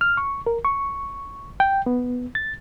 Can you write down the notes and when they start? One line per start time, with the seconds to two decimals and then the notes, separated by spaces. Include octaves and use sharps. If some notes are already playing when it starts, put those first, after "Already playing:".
0.01 F6
0.17 C#6
0.46 A#4
0.65 C#6
1.60 G5
1.86 B3
2.35 A6